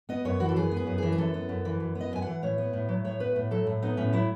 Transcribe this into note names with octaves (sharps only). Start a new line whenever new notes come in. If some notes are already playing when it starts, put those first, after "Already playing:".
B3 D#5
F#2 C#5
E3 F#4
A4
F#2 G#4
B3
G#4
F#2
E3 G#4
G#4
F#2 A4
B3
F#2
E3
F#2
B3
D#5
F#2 G#5
E3 F#5
A2 C#5
B3
A2
F#3
A2 C#5
B3 B4
A2
F#3 A4
A2
B3 D#4
A2 C#4
F#3 E4